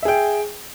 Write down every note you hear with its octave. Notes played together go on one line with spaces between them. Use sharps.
G#4 E5 G5